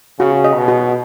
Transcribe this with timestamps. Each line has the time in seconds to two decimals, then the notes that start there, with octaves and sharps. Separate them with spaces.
0.20 C#3 F#4
0.44 D#5
0.56 B2
0.68 F#4